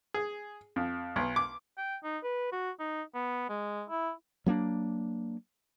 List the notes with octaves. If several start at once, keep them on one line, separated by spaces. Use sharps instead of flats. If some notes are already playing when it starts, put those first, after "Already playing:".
G#4
F2
B1
D6
G5
D#4
B4
F#4
D#4
B3
G#3
E4
F#3 A#3 C#4 D4